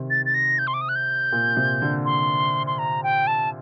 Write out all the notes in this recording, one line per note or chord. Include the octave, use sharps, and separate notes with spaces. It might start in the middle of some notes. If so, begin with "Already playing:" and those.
Already playing: C3 D#3
A6
A6
A#6
G6
C6
D6
D#6
F#6
G6
A#2
C3
D3
C6
C6
A#5
G5
A5